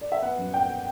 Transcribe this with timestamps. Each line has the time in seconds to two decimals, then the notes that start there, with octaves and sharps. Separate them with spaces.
0.01 D5
0.12 E5
0.22 B3 F#5
0.38 F#2
0.54 B3 G5